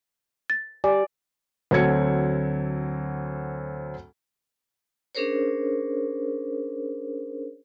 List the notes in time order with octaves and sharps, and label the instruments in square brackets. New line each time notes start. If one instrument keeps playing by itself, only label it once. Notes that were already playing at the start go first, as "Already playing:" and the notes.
[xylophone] A6
[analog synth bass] G3 [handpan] D5 [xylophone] G#5
[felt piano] D2 F#3 C4 A4 G#6 C#7
[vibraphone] C#4 D4 G#4 A#4 C5 C#5